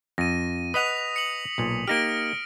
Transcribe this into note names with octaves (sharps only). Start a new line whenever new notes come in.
F2 A#6 D#7
B4 D#5 F#5 D#6 B6 F7
C#7 F#7
B1 A#2
A#3 D#4 G4 F6 A#6 D7